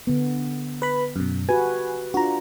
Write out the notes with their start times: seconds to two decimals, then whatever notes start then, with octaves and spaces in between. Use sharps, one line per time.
0.07 D3 B3
0.82 B4 B5
1.16 F#2 B2
1.49 F#4 G4 B4 G#5
2.14 D4 F4 F#4 A#5